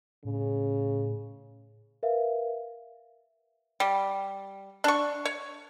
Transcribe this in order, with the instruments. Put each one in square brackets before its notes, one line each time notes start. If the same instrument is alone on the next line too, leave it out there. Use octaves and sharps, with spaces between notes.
[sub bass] A2 [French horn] C#3
[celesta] A#4 B4 E5 F5
[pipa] G3
D4 C#6
C#5